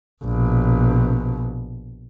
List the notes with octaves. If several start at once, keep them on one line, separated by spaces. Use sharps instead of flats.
A#1 B2